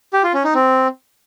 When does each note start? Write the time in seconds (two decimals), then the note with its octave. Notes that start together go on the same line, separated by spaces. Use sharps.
0.13 G4
0.23 F4
0.34 C#4
0.44 D#4
0.54 C4